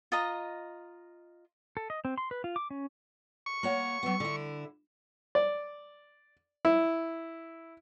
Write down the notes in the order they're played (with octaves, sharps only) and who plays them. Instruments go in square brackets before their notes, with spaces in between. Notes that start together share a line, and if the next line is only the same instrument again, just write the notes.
[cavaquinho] F4 D#5 A#5
[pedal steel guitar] A4
D#5
C4
C6
B4
F4
D6
C#4
[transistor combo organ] C#6
[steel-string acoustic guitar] A#3 C#5 F#5
F#3 B3
D3 E4
[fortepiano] D5
E4